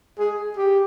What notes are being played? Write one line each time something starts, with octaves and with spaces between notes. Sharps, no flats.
G#4
G4